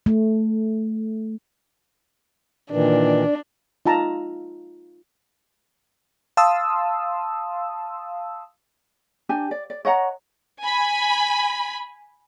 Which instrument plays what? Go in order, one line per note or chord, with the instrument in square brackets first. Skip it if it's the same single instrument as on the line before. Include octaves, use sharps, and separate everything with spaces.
[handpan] A3
[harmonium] A#2 D#3 E3 [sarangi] D4
[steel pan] D#4 F4 A5 A#5
[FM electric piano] F5 A5 C6 D#6 E6
[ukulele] D4 G4 G#5
D5
D5
C#5 D#5 F#5 A#5
[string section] G#5 B5